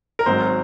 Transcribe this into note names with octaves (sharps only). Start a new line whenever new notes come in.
A#4
G#1 G#2 F#3 C4 C5